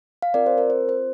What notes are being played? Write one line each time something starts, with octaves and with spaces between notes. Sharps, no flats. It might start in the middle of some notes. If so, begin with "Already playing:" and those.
F5
C4 F4 A#4 D5
C5
A#4
C5
C5